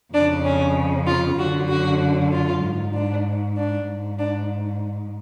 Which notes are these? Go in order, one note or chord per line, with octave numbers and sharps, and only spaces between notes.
F2 C#3 D4
C#4
F4
F#2 D3 F#4
F#4
F4
G#2
D4
D4
G#2
D4